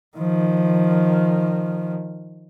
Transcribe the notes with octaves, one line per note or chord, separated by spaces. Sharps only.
D#3 F3